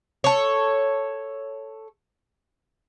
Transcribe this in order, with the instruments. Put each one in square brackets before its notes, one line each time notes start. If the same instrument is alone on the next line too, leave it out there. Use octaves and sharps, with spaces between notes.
[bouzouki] A4 C#5